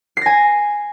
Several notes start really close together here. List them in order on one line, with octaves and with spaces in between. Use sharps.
C7 A#6 G#5